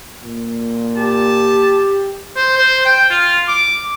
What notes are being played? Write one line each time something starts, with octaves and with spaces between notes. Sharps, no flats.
A#2
G4 A5
C5
C5
G5
F4
D6